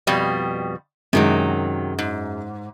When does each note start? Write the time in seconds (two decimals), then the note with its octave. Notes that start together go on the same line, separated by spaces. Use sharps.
0.07 F2 B2 G3
1.13 F#2 C3 D#3 F#3 G#3
1.99 G#2